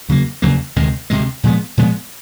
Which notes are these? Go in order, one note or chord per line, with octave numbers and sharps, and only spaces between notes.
E2 C#3 F#3 A#3
E2 C#3 F#3 A#3
D2 C3 D#3 G#3
D2 C3 D#3 G#3
A#2 F3 G#3 B3
A#2 F3 G#3 B3